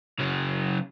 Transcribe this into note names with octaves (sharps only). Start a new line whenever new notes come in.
C#3 F#3